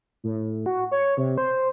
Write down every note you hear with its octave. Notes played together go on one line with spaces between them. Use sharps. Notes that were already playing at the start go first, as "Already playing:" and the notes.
A2
F#4
C#5
C3
C5